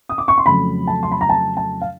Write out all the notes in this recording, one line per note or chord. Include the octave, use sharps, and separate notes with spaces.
D#6
D6
C#6
C6
F2 C#3 F#3 A3 B5
A5
C6
B5
A#5
A5
A5
F5